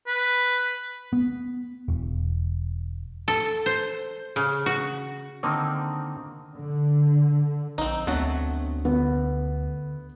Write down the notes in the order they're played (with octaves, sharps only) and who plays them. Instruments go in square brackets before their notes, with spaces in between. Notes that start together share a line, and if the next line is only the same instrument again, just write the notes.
[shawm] B4
[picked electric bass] B3
E1
[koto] A4
C5
C#3
F#4
[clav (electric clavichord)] D3 D#3 A#3 C4 D#4
[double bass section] D3
[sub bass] A#1 [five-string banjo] C4 D#4
[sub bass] D2 [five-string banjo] F#3 A3 F#4 [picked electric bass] B3 C4 D4
[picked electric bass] D3 [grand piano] B3